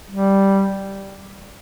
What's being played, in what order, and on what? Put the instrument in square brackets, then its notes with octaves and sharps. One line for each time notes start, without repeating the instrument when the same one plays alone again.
[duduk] G3